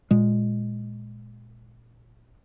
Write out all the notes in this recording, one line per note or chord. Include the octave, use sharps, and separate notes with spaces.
A#2 G#3